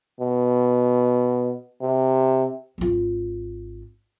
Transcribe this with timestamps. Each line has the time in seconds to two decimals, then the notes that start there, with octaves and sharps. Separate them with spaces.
0.20 B2
1.81 C3
2.78 G#1 F4